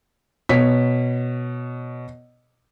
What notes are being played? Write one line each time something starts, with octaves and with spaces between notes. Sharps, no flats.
B2 C#5 B6